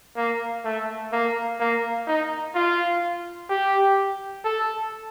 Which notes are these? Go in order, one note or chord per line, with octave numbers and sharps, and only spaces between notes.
A#3
A3
A#3
A#3
D#4
F4
G4
A4